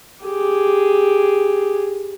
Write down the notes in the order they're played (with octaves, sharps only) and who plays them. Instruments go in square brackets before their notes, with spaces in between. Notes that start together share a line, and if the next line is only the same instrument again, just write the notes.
[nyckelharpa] G4 G#4